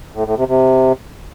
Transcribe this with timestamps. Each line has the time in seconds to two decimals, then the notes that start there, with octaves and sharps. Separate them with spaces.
0.15 A2
0.26 A2
0.37 C3
0.49 C3